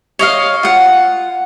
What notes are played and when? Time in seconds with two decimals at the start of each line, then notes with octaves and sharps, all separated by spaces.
0.19 C#5 D#5 F5
0.63 F4 F#5